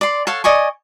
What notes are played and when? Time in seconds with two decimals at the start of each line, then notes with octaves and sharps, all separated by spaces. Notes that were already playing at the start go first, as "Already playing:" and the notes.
0.01 D5 C6
0.27 A4 C#5 F5 F#5
0.44 D5 D#5 G#5 C#6